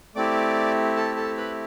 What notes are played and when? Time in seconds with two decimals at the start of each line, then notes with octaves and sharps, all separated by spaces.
0.15 A3 C4 E4 G4 D5 D6
0.96 A4 A5
1.17 A4 A5
1.37 B4 B5